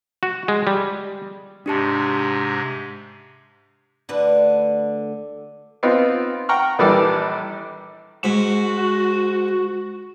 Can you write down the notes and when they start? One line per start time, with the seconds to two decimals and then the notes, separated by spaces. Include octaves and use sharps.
0.23 F#4
0.48 G#3
0.67 G3
1.66 G#2 C3 G#3 D4 G4 A5
4.09 D2 D3 B4
5.83 B3 C4 D#4 F4
6.49 F#5 G5 A#5 C#6 F6
6.79 A#1 D#3 E3 G3 A4 D5
8.24 G#2 F#4